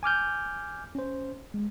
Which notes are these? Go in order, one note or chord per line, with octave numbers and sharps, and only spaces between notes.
G#5 D6 F6 G6
C#4 C5
G#3